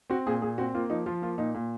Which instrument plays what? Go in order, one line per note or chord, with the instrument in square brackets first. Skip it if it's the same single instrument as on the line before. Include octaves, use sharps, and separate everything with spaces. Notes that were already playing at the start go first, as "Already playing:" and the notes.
[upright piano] C4 F#4
A#2 G#4
A#2 G#4
C4 F#4
A#3 F4
F3 D#4
F3 F4
A#3 F4
A#2 D#4
A#2